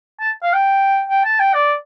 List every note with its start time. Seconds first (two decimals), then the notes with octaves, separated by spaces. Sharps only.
0.21 A5
0.43 F5
0.53 G5
1.09 G5
1.25 A5
1.40 G5
1.54 D5